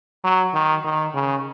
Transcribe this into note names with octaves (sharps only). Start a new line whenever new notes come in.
F#3
D#3
D#3
C#3